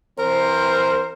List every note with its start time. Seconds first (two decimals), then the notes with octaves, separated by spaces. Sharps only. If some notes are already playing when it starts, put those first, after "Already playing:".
0.18 E3 C4 A#4 C5